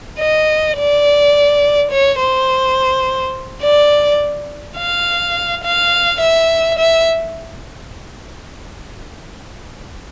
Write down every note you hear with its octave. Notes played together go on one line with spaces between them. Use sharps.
D#5
D5
C#5
C5
D5
F5
F5
E5
E5